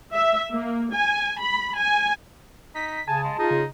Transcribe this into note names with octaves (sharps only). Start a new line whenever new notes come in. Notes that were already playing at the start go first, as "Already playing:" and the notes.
E5
A#3
G#5
B5
G#5
D#4 B6
C#3 G#5 A5
G#3
D#4 F4 G#4
C#3